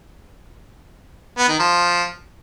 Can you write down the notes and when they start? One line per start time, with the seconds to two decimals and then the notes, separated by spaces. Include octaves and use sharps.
1.38 B3
1.49 D#3
1.59 F3